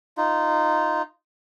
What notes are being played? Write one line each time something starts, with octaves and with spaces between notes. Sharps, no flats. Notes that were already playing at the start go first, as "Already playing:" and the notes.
D#4 F4